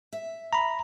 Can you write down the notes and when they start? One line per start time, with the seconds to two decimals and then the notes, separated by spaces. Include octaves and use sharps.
0.13 E5
0.53 A#5 B5